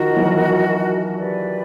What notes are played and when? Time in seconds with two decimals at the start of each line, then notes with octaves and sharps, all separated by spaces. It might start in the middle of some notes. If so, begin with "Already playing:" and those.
Already playing: D#3 F3 F#4 A#4 D#5
0.16 E3 F#3
1.16 G4 B4 D5